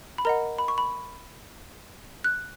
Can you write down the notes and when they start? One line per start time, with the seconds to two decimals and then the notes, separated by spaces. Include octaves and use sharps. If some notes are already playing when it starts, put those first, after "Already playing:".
0.18 B5
0.25 A#4 D#5 F#5 A#5
0.58 B5
0.68 C#6
0.78 B5
2.24 F#6